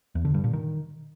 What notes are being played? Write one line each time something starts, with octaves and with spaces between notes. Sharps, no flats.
E2
D3
G2
A#2
D#3